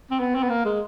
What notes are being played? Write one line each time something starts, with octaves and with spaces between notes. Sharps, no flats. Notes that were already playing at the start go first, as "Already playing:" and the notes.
C4
B3
C4
B3
A#3
G#3